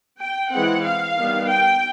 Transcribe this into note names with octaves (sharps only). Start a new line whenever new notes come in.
G5
E3 G#3 C4 F#5
F5
D#3 G3 B3
G5